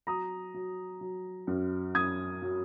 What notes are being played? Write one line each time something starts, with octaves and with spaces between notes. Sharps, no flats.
F#3 A#5 D#6
F#3
F#3
F#2
F#2 D#6 G#6
F#3